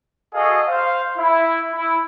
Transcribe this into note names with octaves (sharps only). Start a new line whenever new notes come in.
F#4 G#4 A4 D#5 F5
C5 F5
E4
E4